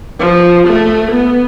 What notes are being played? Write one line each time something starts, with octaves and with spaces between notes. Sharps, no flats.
F3
A3
B3